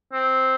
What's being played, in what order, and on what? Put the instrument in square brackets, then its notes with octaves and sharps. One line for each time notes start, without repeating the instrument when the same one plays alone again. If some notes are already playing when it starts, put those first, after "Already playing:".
[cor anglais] C4